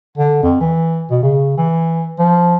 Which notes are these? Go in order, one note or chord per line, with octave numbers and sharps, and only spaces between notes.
D3
F2
E3
B2
C#3
E3
F3